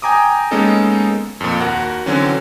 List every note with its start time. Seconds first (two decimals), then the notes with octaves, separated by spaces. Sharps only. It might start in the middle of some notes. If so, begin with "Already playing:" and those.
0.02 G5 G#5 A#5 D6 D#6
0.51 G#3 A#3 B3 C#4 D#4 A4
1.41 F2 A#2
1.60 D#2 F#4 A#4 F#5
2.06 D3 E3 F#3 C4 C#4